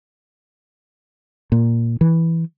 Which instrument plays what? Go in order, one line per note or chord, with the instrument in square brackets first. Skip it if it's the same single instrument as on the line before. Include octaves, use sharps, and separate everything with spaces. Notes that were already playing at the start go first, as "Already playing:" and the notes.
[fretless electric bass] A#2
E3